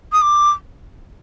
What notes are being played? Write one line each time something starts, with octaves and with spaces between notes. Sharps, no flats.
D#6
D6